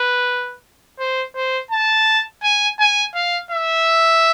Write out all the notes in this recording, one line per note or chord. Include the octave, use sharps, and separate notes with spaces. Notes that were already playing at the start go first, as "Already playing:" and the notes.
Already playing: B4
C5
C5
A5
G#5
G#5
F5
E5